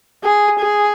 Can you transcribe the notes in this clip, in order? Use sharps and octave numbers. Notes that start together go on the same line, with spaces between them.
G#4
G#4